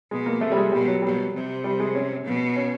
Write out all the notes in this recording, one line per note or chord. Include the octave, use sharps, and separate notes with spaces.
B2 G#3
A#3
C3 A3
G3
G#3
B2 G3
F#3
B2 G3
C3
G3
G#3
C#4
B2
C#4